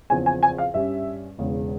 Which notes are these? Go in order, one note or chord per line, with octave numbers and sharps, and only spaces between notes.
E2 C#3 F3 C4 G#5
G#5
G#5
F5
G2 G3 C#4 E5
E1 E2 C#3